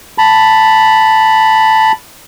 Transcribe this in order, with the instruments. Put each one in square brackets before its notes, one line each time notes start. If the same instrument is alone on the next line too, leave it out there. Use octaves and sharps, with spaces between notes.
[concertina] A5 B5